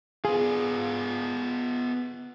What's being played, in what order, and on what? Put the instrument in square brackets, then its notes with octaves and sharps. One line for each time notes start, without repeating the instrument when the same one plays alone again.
[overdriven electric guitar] B3 F4 [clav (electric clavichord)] G#4